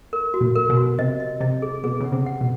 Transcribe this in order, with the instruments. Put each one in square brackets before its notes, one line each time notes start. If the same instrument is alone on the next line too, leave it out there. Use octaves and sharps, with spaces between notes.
[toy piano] A#4
F#4
[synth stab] A#2
[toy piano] A#4
[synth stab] B2
[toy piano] F#4
[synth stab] C3 [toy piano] D#5
[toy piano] D#5
[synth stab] C3 [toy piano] D#5
[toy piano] G#4
[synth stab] B2 [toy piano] G#4
[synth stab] C#3 [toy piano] F#5
[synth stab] C3
[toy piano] F#5
[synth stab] B2